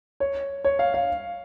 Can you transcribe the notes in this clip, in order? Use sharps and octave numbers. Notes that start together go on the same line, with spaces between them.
C#5
C#5
F5
F5